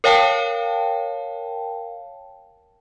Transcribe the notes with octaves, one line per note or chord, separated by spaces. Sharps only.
A#4 C#5 F5 G5 A5